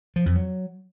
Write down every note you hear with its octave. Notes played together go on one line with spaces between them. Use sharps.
F3
F2
F#3